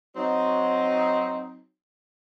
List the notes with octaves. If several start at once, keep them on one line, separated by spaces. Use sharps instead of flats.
F#3 C4 D#4